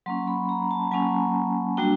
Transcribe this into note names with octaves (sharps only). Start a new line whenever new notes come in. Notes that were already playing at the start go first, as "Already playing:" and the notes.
F#3 A#3 C#4 C6
B5
A#5
A5
F#3 A#3 C#4 G#5
G3 A#3 D4 F#4 G5